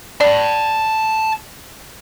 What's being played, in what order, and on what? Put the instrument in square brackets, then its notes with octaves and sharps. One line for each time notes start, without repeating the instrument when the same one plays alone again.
[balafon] D5 [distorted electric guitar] A5 B5